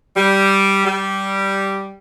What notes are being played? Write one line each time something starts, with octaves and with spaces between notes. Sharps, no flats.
G3
G3